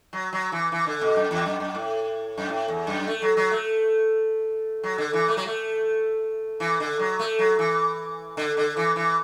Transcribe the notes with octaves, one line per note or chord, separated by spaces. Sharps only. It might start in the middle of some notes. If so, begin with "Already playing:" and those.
F#3
F#3
E3
E3
D3
B2
F#2
E2
F#2
F#2
A2
F#2
A2
E2
F#2
A3
F#3
F#3
A3
F#3
D3
E3
A3
F#3
A3
E3
D3
F#3
A3
F#3
E3
D3
D3
E3
E3